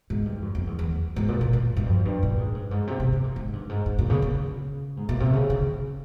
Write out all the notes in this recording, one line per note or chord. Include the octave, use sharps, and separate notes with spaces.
G#2
G2
F2
F2
E2
E2
G#2
A#2
A#2
A#2
G2
F2
G2
A#2
G#2
G2
G#2
C3
C3
C3
A#2
G#2
G2
G#2
G#2
A#2
C#3
C#3
G#2
A#2
C3
C#3
C#3